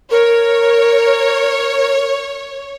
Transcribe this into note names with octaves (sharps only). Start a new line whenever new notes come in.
A#4 C#5